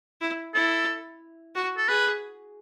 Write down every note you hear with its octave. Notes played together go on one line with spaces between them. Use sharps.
E4
E4 A4
F#4
A4
G#4 B4